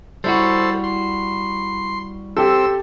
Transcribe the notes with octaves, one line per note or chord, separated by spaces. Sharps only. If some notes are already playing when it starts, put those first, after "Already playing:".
G3 E4 F#4 A4 C5
C6
C4 G4 A4 E6